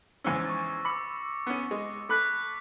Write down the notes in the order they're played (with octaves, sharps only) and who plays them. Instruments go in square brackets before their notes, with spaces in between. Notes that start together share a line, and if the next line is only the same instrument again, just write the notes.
[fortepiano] E2 G#2 C#4 [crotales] E6 A#6
[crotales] C#6 A6
[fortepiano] B5 E6 [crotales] D6 C#7
[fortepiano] B3 C#4
G#3
[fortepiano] A3 B5 [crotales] D6 F#6 B6